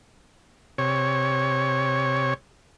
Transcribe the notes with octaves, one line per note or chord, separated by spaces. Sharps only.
C3 C#5